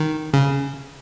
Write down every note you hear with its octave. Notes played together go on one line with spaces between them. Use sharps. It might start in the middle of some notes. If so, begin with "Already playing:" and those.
Already playing: D#3
C#3